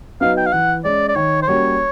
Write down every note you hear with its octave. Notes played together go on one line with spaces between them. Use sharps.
F#3 B3 D#4 F5
G5
F5
E3 F#5
G#3 C#4 D5
D5
D#3 C#5
C5
G3 A#3 C#4 F#4 C#5